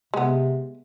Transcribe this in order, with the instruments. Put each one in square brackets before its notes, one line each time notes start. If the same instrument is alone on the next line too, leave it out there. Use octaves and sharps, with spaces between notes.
[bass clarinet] C3 [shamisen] G#3 B3